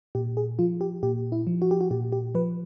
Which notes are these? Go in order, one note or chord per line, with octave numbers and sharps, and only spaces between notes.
A#2 G4
G#4
F3 F4
G4
A#2 G4
E4
F3
F#4
G4
F#4
A#2 G4
G4
F3 B4